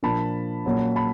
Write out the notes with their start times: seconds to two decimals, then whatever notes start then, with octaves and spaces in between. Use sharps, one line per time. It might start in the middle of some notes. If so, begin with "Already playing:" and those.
0.03 A#2 F3 A#3 D4 A5 B5
0.65 A#2 F#3 A#3 C#4
0.96 A5 B5